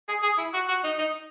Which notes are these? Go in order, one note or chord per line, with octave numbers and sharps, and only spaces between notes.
G#4
G#4
E4
F#4
F#4
D#4
D#4